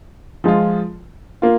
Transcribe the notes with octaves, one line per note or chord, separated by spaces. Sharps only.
F3 G#3 F4
A#3 F4